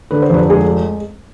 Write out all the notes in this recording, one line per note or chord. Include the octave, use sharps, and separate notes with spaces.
D3 B4
C5
F1 B4
G#3 G#4